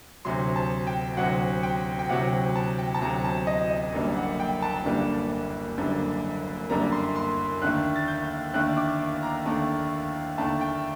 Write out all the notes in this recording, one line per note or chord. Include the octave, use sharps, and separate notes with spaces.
D2 C3 F#3 C6
A5
G5
D2 C3 F#3 F#5
G5
G5
D2 C3 F#3 F#5
A5
G5
A5
D2 C3 F#3 A#5
A5
D#5
D#5
F#1 F#2 D3 G3 A#3
F#5
G5
A5
F#1 F#2 D3 G3 A#3
F#1 F#2 D3 G3 A#3
F#1 F#2 D3 G3 A#3 A#5
C6
C6
D#2 D3 A3 F#6
A6
G6
D#2 D3 A3 F#6
D6
A#5
D#2 D3 A3
D#2 D3 A3 A5
G5